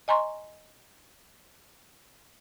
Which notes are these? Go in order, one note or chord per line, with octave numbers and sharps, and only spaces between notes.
D#5 G#5 A#5 C6 C#6